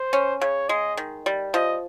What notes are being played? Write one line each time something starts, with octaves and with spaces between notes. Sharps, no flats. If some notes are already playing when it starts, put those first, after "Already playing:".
Already playing: C5
C#4
C#3 C#5
G#3 D#5
D#3
G3
F3 D#5